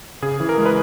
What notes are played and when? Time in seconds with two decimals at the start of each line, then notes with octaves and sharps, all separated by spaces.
0.22 C#3 G#4
0.40 E3
0.49 A#4
0.58 G#3
0.66 B4